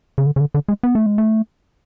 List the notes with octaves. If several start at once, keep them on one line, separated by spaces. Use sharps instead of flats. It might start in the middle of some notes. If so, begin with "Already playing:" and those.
C#3
D3
C#3
D3
D3
G#3
B3
A3
G#3
A3